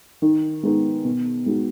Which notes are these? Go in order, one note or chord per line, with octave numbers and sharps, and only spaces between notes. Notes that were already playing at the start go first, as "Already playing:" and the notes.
D#3
G#3 B3 D#4
B2
G#3 D#4 F#4